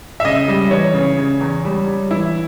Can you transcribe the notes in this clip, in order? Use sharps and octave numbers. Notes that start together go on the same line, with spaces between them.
E5
C#3 D#5
G3
E3 C#5
C#3
C#3
E2
G3
G3
E3 E4